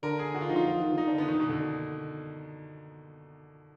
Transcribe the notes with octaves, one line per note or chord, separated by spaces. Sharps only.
D3 A#4
G#4
D3 F#4
F4
F3 D#4
F4
F3
D#3
D3
D#3 D#4
D4
D3
B3
D#3
B2
D3